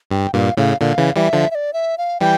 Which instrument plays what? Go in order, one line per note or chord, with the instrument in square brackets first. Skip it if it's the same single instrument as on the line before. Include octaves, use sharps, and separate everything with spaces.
[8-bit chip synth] G2 [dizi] G5
[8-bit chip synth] G2 A#2 [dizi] F5
[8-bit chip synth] A2 C#3 [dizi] F5
[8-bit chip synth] A#2 D3 [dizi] F5
[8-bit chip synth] C#3 E3
[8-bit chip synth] E3 G3 [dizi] E5
[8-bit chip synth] D3 F3
[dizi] E5
D5
E5
F5
[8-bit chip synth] E3 G3 [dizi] G5